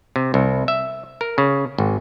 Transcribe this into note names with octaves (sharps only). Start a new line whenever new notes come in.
C3
C2
E5
A#4
C#3
G#1